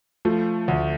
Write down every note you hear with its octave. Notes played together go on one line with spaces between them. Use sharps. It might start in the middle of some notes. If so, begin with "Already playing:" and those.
F3 A3
D2